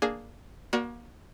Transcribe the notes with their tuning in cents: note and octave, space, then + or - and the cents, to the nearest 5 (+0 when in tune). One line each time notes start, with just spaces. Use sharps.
A#3 +0 D4 +0 G#4 +0
A#3 +30 F#4 +0 D5 +0